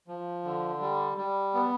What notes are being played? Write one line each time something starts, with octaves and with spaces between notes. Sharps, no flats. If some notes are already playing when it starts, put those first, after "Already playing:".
F3
D3
G3
G3
B3